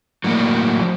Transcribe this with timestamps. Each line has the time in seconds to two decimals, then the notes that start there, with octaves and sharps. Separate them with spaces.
0.24 A2 F#3 A#3 D4 F#4
0.81 F3